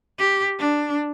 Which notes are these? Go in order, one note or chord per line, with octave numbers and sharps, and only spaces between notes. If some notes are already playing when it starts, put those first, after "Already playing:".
G4
D4